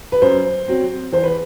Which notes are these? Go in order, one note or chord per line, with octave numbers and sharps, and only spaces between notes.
B4
F#2 C5
F#3 C4
E2 C5
B4